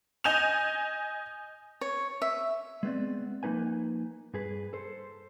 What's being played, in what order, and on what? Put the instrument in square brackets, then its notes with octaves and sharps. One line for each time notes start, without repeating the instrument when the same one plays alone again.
[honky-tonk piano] D#5 G#5 G6 E7 F7
[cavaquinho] C#5
E5
[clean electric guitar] G#3 B3 C4 D5
F3 A#3 D#4 B4 G#5
G2 G#4 B4
A4 C5